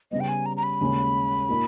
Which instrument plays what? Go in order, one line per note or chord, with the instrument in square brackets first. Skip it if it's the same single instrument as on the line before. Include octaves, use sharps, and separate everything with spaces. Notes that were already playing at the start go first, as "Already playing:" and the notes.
[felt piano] C#3 G3 B3 [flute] D#5
[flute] G5
G#5
A#5
A#5
B5
[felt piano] D#2 C#3 G#3 C#4
A#2 A#3 D#4